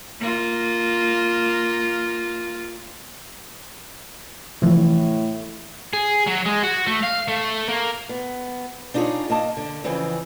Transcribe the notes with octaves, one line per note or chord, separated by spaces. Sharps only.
A#3 F4
A2 C3 E3 F3
G#4
F#3
G#3
F#4
A3
F5
A3
A#3
B3
D4 D#4 F4 G4 G#4 C#5
A#3 D#5 A5
D3
F2 C#3 E3 C4